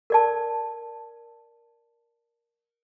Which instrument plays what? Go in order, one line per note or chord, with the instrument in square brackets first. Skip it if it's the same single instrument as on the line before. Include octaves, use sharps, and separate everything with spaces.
[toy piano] A#4 D5 A5